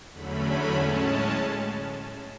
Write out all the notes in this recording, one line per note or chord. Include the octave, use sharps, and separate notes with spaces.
E2 D3 F#3 A3 C#4 B5
A2 G#3 C#4 A5